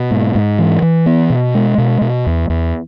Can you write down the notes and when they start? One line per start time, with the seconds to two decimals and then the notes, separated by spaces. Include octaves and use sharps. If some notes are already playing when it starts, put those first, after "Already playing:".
Already playing: B2
0.11 G#2
0.35 G#2
0.59 E3
0.82 E3
1.06 B3
1.30 B2
1.55 G#3
1.78 B2
2.01 B2
2.26 E2
2.50 E2